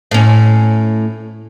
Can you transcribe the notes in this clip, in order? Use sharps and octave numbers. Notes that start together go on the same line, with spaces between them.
A2 C#4